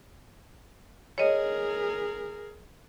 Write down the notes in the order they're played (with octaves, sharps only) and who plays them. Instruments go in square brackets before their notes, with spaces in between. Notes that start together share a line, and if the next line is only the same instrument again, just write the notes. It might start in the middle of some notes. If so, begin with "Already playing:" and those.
[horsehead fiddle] G#4 A#4 [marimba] C#5 D#5